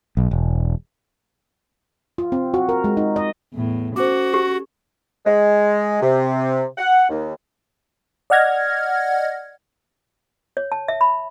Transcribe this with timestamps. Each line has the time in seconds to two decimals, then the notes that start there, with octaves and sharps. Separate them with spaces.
0.17 B1
0.31 E1
2.18 F4
2.32 C4
2.54 F#4
2.69 A#4
2.84 G#3
2.97 D#4
3.16 D#5
3.53 E2 A2
3.96 C#4 F#4 A4 C5 D6
4.34 G4
5.25 G#3
6.02 C3
6.78 F#5
7.09 D#2
8.30 D5 D#5 F#5 F6 G#6 A#6
10.57 C#5
10.72 A5
10.88 E5
11.01 B5